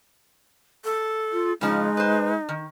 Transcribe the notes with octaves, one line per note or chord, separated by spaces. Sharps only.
A4
F4
C#3 F3 G#3 D#4
B4 C5
D#3